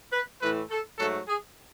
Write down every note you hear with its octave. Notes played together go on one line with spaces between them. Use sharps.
B4
A2 E3 A3 B4
A4
G#2 F#3 A3 A4
G#4